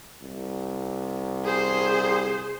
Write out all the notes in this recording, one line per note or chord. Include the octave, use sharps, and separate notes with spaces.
C2
G#4 C5